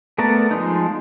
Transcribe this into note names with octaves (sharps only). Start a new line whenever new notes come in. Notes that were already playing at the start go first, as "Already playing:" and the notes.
A3 B3 A#4 D5 A5
F3 G#3 D#4